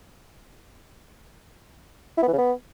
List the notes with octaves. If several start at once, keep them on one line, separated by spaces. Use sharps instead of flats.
E4
B3
E3
C#3
B3